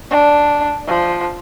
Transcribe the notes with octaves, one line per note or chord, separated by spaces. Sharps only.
D4
F3